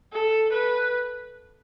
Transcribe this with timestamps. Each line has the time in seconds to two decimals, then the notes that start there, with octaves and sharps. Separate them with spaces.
0.13 A4
0.53 B4